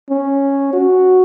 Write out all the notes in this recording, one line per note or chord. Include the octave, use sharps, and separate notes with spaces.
C#4
F#4